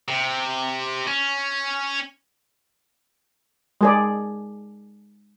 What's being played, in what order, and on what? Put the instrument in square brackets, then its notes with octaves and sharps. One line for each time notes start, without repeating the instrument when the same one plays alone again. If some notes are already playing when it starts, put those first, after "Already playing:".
[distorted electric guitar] C3
C#4
[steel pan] G#3 G#4 D5